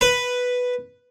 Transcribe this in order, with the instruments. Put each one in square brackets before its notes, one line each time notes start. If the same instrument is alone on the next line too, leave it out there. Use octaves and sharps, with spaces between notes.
[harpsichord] B4